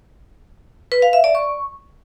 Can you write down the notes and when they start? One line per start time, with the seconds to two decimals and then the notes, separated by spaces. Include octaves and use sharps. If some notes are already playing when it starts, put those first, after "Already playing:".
0.92 B4
1.02 F5
1.13 E5
1.24 D5
1.35 C#6